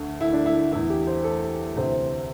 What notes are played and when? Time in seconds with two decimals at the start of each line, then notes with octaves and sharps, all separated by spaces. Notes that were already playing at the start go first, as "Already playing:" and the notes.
Already playing: D2 D3
0.21 E4
0.33 D4
0.46 E4
0.72 E2 E3 E4
0.90 G4
1.07 C5
1.24 A4
1.76 D2 C3 E3 C5